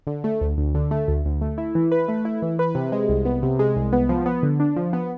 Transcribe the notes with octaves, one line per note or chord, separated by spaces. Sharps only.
D3
A3
D2
D2
D3
A3
D2
D2
A3
E4
E3
B4
A3
E4
E3
B4
C3
G#3
C2
B3
C3
G#3
C2
B3
F3
B3
D3
D4
F3
B3